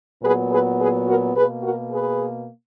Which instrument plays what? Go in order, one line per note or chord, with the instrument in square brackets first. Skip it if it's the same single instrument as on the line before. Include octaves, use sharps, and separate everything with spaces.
[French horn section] A#2 F#3 B3 G#4 B4
G#4 B4
G#4 B4
F#4 A#4
B2 A#3 G#4 B4
F#4 A#4
G#4 B4